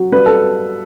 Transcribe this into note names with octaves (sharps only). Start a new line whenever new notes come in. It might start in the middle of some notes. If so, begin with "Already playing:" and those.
Already playing: F#3
G3 B4
A4